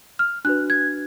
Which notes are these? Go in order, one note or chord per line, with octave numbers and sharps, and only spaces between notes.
F6
D4 F#4 B4 F#6
G#6